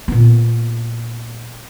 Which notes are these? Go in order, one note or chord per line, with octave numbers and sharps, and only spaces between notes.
A#2 B3